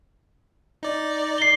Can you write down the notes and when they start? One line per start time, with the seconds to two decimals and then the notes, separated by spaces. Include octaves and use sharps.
0.83 D#4 D5
1.38 C7 G7